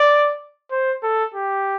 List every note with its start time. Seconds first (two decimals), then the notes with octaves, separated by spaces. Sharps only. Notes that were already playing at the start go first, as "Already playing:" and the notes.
Already playing: D5
0.71 C5
1.03 A4
1.34 G4